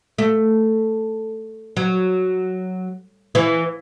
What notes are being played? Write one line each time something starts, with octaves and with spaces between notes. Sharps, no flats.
A3
F#3
E3